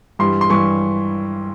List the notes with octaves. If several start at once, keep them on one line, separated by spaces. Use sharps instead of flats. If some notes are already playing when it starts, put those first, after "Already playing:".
G2 E3 G3 C6
C6
G2 E3 G3 C#6